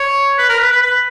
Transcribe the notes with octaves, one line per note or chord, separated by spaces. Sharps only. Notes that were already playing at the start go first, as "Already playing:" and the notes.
Already playing: C#5
B4
A#4
B4
B4
B4